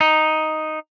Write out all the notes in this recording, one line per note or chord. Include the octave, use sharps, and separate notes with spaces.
D#4